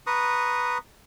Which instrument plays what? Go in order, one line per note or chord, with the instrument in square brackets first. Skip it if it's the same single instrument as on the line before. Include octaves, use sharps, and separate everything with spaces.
[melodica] B4 A#5 C#6 D#6